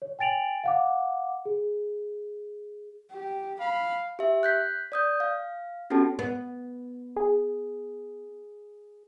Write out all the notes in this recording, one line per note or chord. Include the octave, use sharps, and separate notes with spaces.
C#5
G5 G#5 A6 D7 F7 F#7
F5 F#5 D6
G#4
G4
F5 B5
G4 E5
F#6 G6 B6
D5 D#6 G6
F5
B3 C#4 F#4 G4 A4 A5
B3
G#4